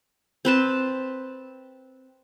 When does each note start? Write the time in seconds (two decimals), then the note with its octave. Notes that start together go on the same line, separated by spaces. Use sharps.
0.45 C4 B4 A5